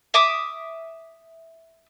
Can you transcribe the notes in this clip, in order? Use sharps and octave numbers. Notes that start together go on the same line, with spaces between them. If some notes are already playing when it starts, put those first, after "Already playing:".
E5 D6 D#6